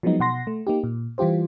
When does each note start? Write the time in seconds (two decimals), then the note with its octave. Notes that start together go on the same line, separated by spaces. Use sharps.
0.03 F3 F#3 G#3 B3 D#4
0.20 B2 F#5 C6 A#6
0.47 A3
0.67 A#3 D#4 G4
0.84 A#2
1.18 E3 G3 F4 G4 C5